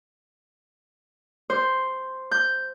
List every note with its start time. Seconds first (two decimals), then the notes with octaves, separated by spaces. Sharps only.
1.50 C5
2.31 G6